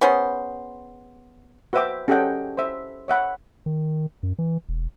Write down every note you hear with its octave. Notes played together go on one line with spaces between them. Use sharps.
B3 C#4 G#4 C5
F#4 B4 C5 E5 G5 D6
C#4 G4 A4 D#5 F#5 G5
C5 E5
C#5 E5 F#5 B5
D#3
F#2
E3
E1